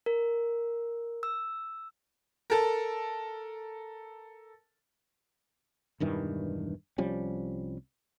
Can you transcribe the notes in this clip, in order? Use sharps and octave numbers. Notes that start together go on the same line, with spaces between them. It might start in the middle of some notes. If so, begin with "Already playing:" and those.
A#4
E6
A4 A#4
E1 G2 D#3 E3
C2 F3 G3 C#4